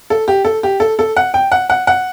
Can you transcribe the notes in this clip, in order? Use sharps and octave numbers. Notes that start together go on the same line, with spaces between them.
A4
G4
A4
G4
A4
A4
F#5
G5
F#5
F#5
F#5